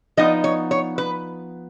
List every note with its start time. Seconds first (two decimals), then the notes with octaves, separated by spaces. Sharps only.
0.17 F3 B3 D#4 D#5
0.44 C#5
0.71 C#5
0.98 B4